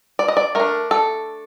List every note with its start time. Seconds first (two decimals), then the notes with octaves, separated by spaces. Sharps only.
0.19 D5
0.28 D#5
0.37 D5
0.55 A3 D4 A#4
0.91 A4